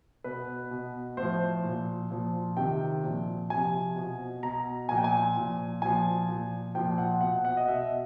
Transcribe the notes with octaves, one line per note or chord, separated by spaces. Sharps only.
B2 B4
B2
A2 F3 C5
A#2 F3
A#2 F3
C3 D#3 G5
A#2 F3
C3 F3 G#5
B2
B2 A#5
A#2 F3 G#5
G5
G#5
A#2 F3
A#2 F3 G#5
A#2 F3
A#2 F3 G5
F#5
B2 F#5
F#5
D#5
B2 E5